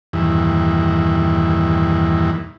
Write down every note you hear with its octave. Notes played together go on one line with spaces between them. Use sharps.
E2 G2 A#2 D#3 E3